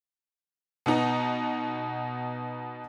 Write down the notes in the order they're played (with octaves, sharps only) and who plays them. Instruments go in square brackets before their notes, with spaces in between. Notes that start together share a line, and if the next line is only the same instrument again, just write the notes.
[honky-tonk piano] B2 B3 D#4